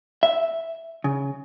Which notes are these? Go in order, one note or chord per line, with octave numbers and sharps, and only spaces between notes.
E5
C#3